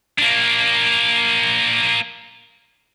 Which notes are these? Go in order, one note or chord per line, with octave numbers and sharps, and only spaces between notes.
A#3 D4